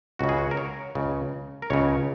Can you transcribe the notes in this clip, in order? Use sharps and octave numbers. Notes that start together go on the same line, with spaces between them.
C#2 C#3 F#4
G#4
F#4
A#4
C#5
C#2 C#3
A#4
C#2 C#3 C#5